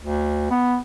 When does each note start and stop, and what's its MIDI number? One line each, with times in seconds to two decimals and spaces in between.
0.02 0.50 38
0.50 0.77 59